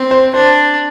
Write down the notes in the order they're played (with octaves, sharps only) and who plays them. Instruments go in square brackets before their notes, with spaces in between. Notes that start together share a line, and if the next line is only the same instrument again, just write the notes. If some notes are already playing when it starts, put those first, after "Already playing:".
Already playing: [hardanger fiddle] C4
[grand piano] C5
[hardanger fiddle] D4 [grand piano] C5